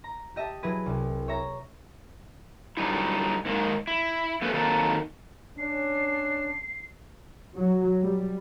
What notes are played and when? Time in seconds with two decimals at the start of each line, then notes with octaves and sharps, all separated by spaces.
0.04 A#5
0.36 G4 D#5 E5 A5
0.63 F#3 E4 G#4 B4
0.86 C2
1.28 C#5 E5 A#5
2.77 D3 F#3 G3 D#4 E4
3.45 G#2 D#3 A#3
3.87 E4
4.42 A3 A#3 C#4 A4 B4
4.54 D#3 F#3 A#3 C4 D#4 A4
5.58 C#4 D4 C7
7.55 F#3
8.03 G3